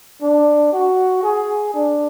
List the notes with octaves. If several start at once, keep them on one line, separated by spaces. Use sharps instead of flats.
D4
F#4
G#4
D4